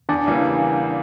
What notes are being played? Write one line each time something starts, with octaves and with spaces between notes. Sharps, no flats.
E2 D4 D5
C#3 E3 G3 A#3